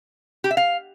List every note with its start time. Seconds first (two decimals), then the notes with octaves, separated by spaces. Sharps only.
0.44 G4
0.51 E5
0.57 F5